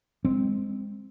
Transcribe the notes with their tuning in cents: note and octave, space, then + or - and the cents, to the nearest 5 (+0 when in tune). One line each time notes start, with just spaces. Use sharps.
G#3 -20 C4 -10